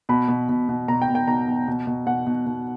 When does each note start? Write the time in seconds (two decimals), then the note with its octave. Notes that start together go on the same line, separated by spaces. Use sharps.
0.09 B2 B5
0.28 B2
0.49 B2
0.69 B2
0.88 B2 A#5
1.02 G5
1.08 B2
1.15 G5
1.28 B2 A#5
1.48 B2
1.68 B2
1.87 B2
2.07 B2 F#5
2.27 B2
2.46 B2